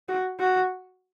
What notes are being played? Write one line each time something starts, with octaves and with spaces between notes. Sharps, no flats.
F#4
F#4